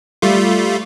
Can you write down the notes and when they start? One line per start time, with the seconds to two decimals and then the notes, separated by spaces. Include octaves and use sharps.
0.22 G3 A3 F4